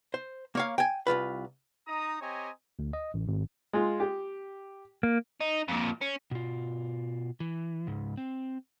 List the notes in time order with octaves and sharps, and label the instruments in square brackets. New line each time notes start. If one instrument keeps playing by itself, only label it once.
[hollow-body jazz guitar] C5
A#3 C#5 F5
G5 G#5
C2 D#3 F4 B4
[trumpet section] D#4 A#5 D#6
C4 G4 C#5 D#5 G#5 A#5
[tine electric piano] D2
D#5
A1
G#1
[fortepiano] G#3 F4
G4
[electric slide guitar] A#3
[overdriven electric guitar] D#4
F2 A#2
C#4
[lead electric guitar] B2 F4
E3
C#2 G#2
C4